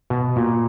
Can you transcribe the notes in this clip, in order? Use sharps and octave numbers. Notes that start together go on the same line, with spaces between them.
B2
A#2